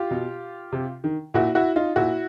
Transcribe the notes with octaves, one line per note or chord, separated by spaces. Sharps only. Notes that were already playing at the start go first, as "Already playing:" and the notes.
Already playing: F4 G4
B2
C3
D#3
A#2 E4 F#4
E4 F#4
D#4 F4
A#2 E4 F#4